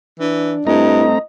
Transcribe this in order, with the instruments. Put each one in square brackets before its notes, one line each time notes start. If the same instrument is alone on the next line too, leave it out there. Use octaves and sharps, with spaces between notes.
[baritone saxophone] E3 [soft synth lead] D4
[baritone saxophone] G2 [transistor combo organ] A3 C4 A#5 [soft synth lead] E4 [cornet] D#5